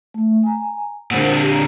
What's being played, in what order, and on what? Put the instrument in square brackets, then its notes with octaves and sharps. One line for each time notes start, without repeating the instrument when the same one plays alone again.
[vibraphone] A3
G#5 A#5
[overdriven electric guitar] A#2 D3 [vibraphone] A#4 C5 F#5
[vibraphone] G4
A#5